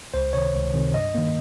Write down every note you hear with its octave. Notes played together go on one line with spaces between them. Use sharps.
C#2 C5
C3 D#3 C#5
C#2
C3 D#3
G2 D#5
D#3 A#3